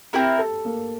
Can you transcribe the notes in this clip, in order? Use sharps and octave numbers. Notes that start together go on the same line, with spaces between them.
C4 E4 G4 A#4
A4
A#3